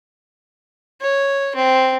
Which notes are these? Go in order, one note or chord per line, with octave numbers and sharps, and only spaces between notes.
C#5
C4